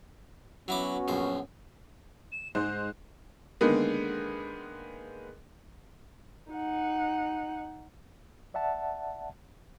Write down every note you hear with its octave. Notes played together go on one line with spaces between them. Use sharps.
F#3 B3 C#4 E4 F#4 D6
A#1 F#2 C5
E7
G#2 G#3 D#4 C5 F#6
D3 D#3 G#3 A#3 B3
D#4 F#5
D5 E5 F#5 A5